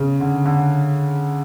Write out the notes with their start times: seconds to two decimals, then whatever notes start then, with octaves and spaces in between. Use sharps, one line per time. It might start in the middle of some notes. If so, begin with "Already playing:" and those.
Already playing: C#3
0.20 D3
0.46 D3